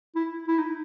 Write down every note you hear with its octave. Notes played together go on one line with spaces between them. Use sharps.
E4
E4
D#4